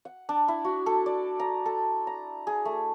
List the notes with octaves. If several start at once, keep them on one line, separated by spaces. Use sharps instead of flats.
F#5
D4
E4
F#4
A4
D5
A#5
A4
A#5
G#4
A3